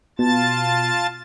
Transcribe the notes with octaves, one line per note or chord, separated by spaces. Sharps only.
B2 F4 A5 A6